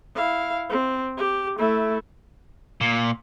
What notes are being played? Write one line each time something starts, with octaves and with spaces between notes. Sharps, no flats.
E4 F5
C4
G4
A3 E4
A#2